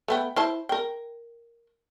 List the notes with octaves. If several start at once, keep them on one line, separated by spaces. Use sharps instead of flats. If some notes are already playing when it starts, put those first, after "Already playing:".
A3 B3 G5
E4 C5 A5
A#4 G5